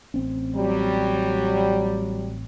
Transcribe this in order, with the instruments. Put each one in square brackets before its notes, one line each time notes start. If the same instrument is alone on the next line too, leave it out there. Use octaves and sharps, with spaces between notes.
[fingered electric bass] A1 C4 C#4
[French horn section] F#3 G3